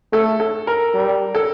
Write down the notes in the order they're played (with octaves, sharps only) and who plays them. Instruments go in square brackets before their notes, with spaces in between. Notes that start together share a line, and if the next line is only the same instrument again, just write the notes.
[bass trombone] A3 [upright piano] A4
[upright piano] A4
A#4
[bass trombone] G3
[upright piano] A4